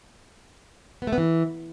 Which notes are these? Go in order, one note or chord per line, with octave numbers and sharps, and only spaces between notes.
B3
A3
B3
E3